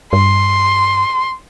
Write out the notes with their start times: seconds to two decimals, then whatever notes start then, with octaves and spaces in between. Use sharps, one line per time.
0.13 G2 C6